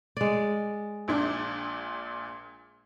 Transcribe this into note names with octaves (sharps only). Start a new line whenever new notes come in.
G#3 D5
A#1 A#2 D4